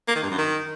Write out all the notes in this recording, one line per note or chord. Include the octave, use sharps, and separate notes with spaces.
A#3
D#3
G2
F#2
D#3